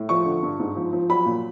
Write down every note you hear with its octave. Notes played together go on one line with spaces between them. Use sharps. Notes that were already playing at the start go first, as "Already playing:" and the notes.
Already playing: A2
F3 C#6
D3
G2
G#2
F3
F3
F#3 B5
A#2